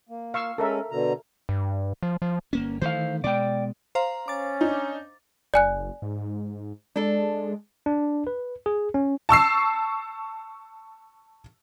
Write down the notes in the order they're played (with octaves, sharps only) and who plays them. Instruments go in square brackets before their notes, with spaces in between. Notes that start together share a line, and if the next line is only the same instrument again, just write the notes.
[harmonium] A#3
[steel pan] F5 C#6 E6
[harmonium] G#3 C#4 [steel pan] A4 A#4 E5
[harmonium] B2 D3 A#5
[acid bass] G2
F3
F3
[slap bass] G1 A#3 C#4
[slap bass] D#3 E3 A3 [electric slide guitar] C5 F5
[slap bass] B2 G#3 [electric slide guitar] D5 G5
[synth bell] C5 F5 A#5
[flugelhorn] C#4 [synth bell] D6 A6
[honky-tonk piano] D4 D#4
[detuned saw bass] F#1 [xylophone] D5 G#5 F#6
[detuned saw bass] G#2
[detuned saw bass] G#3 [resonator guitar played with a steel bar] D4 A4
[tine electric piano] D4
B4
G#4
C#4
[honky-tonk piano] A5 C#6 E6 C7